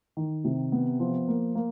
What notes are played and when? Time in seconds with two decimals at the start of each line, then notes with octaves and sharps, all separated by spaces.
0.17 D#3
0.44 C3
0.72 B3
1.00 F3
1.28 A#3
1.55 A#3